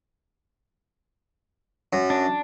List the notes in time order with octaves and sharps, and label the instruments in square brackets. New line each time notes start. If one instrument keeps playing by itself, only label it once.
[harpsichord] F#2
[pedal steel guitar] D4